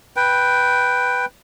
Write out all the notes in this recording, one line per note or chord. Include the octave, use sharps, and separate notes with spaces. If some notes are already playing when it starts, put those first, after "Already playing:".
B4 G5